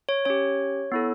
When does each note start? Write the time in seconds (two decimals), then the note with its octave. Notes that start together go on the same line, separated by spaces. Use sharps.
0.09 C#5
0.25 C#4 G4 C#5
0.92 B3 E4 A4